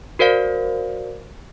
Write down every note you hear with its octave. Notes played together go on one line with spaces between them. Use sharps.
F#4 A#4 C5 D5 F5